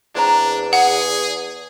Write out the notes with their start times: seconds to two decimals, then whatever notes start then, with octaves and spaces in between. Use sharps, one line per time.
0.15 E2 G#3 C4 D4 A#5
0.73 G#4 F#5